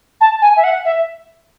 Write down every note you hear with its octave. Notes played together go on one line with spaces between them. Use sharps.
A5
G#5
E5
F#5
E5